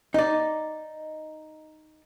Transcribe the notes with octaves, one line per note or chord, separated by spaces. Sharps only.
D#4 D5